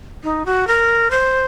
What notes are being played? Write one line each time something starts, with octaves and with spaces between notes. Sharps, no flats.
D#4
F#4
A#4
C5